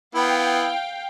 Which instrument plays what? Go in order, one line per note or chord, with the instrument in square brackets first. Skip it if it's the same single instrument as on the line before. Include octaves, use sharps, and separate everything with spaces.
[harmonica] B3 E4 [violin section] F5 G5